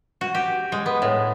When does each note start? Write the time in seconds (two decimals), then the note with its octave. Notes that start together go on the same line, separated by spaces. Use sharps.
0.21 F#4
0.35 G4
0.72 G#3
0.86 B3
1.02 A2